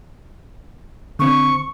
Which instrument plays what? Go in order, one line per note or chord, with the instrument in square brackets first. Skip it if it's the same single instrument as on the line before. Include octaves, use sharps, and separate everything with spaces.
[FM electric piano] D3 C4 [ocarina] C#6